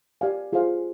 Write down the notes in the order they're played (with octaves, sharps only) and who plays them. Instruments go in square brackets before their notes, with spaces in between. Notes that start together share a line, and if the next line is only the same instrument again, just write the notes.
[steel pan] G4 D5 F5 G#5
F4 G#4 C5 F5